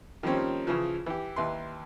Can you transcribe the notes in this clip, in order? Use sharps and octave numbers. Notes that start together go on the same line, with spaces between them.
D#3 F3 G3 A#3 C4 C#4
C#3 E3 F3
E3 G4
D#2 E4 B4 C6